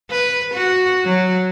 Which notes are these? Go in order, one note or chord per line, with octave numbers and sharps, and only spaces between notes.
B4
F#4
F#3